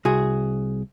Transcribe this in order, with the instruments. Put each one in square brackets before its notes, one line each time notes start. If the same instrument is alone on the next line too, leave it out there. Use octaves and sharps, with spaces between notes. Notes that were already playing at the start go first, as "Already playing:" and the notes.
[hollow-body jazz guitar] C2 F#4 G#4